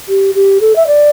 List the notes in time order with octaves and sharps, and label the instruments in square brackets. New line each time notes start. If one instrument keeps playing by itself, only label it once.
[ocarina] G4
G4
A4
E5
D5